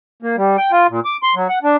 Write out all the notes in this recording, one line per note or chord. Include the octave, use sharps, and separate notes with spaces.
A#3
G3
G5
F4
A#2
D6
C6
F#3
F#5
D4